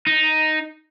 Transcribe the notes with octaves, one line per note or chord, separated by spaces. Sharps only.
D#4